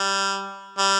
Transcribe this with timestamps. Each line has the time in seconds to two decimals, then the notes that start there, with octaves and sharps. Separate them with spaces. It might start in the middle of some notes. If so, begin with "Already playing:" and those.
Already playing: G3
0.78 G3